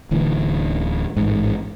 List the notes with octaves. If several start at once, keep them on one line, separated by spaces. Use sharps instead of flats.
D1 D2 E3
A1 G#2